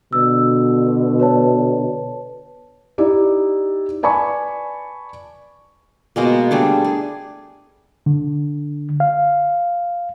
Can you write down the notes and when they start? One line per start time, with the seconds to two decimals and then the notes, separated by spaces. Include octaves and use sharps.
0.13 B2 D3 E6
1.19 B4 C#5 A5
2.98 D#4 E4 G4 D5
4.03 B4 D5 G#5 A5 B5 C#6
6.16 B2 G#3 A#3
6.51 G3 A3 D4 G#4
6.85 G#4
8.06 D3
9.00 F5